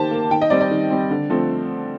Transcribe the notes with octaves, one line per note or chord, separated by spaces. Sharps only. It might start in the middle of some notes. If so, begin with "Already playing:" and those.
Already playing: D#3 A#3 G4 C5 A5
A#3
D#3 G5
D#5
G3 C4 D5
D5
D#3
G3 C4
D3
F3 A3 C4